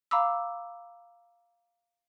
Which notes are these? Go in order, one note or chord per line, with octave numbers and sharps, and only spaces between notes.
F5 A#5 B5 D6 E6